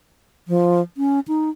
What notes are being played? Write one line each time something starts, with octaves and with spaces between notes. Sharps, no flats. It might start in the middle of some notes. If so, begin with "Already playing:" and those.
F3
C#4
D#4